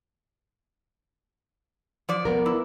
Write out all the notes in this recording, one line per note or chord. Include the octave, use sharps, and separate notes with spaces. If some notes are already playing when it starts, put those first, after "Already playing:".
F3 D5
B3 A#4
E4